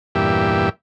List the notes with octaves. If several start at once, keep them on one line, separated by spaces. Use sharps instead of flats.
E2 G2 A#2 G4 E5